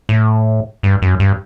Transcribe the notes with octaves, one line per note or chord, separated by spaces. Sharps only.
A2
G2
F#2
G2